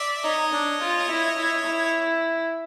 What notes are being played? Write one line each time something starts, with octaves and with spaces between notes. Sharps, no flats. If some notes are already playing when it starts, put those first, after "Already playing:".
Already playing: D5 E5
D#4 C#5 D#5
D4
F4
E4
E4
E4